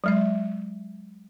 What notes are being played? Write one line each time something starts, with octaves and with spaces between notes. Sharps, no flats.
F#3 G#3 E5